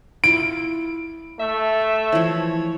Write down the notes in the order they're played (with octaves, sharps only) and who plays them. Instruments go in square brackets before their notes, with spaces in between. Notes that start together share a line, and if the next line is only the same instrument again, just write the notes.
[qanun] E4 F4 [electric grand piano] D7
[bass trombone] A3 [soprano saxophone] E5
[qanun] E3 F3 [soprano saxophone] C#5